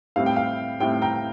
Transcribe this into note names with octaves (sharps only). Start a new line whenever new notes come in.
A2 G3 C4 E4 F5
G5
F5
A2 G3 C4 E4 G5
G5 A#5